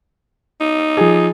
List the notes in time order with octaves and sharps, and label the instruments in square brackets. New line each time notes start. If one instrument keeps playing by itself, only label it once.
[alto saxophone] D#4
[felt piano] F3 G#4